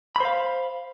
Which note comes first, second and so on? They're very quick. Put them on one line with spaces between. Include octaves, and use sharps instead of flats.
B5 C5 F5